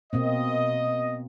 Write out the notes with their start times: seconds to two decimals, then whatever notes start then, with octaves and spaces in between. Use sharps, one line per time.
0.13 B2 A#3 C4 D#5